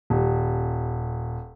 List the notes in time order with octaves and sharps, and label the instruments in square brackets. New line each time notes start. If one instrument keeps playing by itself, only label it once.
[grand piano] D#1